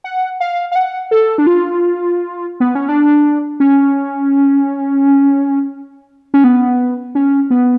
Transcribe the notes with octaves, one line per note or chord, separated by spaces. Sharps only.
F#5
F5
F5
F#5
A4
D4
F4
B3
C#4
D4
C#4
C#4
B3
C#4
B3